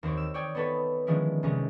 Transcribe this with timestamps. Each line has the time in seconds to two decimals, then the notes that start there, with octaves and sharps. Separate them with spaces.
0.03 D#2 C4 C5 C#5
0.17 E6
0.34 C#5 D5 G5 D#6 G#6
0.55 B3 D#4 A4 B4 C#5
1.07 D3 D#3 F3 G#3 C#4 E4
1.43 C2 G#3 C#4 D#4